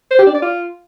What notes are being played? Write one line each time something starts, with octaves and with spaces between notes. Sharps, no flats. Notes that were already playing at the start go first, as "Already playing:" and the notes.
C5
G4
D4
D5
F4